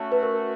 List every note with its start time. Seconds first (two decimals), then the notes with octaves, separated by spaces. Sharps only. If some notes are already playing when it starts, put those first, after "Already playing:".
Already playing: A3 C#4 F#4
0.12 B4
0.23 A#4